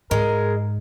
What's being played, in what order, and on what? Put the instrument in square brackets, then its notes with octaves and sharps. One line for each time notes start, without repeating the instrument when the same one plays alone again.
[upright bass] G#2 [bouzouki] G#3 [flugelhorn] A#4